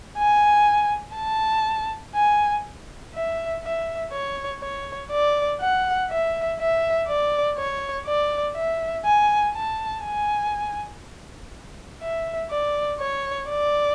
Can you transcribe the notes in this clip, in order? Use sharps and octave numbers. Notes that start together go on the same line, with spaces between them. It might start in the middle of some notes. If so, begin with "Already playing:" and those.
G#5
A5
G#5
E5
E5
C#5
C#5
D5
F#5
E5
E5
D5
C#5
D5
E5
G#5
A5
G#5
E5
D5
C#5
D5